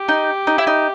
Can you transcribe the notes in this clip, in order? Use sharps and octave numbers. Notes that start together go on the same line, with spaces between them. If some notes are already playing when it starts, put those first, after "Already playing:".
Already playing: G4
D#4
D#4
E4
D#4